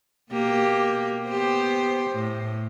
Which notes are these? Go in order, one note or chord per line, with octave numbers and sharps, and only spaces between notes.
B2 A#3 G4
B3 G4 C5
A2